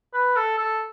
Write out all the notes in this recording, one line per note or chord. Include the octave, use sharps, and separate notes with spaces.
B4
A4
A4